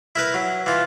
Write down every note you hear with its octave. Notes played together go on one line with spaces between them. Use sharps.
E4 A#4 B4
F#3
E3 F4